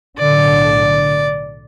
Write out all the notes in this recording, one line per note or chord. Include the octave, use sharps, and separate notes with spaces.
B1 A2 D3 D5